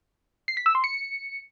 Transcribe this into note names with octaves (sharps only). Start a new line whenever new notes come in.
C7
B6
E6
C6
C#7